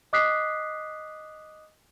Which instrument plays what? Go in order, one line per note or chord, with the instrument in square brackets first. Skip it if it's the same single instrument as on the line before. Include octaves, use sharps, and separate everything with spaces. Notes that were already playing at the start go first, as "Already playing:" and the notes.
[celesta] D#5 D6 D#6 F#6 B6 C7